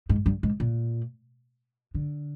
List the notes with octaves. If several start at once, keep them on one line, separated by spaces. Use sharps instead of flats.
G#2
G2
G#2
A#2
D3